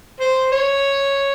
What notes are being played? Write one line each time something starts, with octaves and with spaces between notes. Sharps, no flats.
C5
C#5